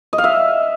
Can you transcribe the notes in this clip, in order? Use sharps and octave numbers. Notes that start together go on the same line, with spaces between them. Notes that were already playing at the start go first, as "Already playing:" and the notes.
D#5
F5
E5